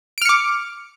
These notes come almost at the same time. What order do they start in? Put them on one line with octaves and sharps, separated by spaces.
D7 F6 C#7 D6